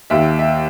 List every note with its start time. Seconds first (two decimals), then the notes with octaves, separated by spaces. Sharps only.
0.10 D#2 E5
0.39 E5